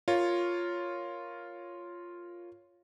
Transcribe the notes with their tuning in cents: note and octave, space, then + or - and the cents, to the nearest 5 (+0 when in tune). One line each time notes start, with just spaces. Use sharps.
F4 +0 A#4 +0 C#5 +0